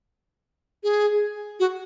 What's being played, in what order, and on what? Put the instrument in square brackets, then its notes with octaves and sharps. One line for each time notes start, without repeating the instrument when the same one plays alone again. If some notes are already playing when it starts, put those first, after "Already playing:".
[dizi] G#4
F#4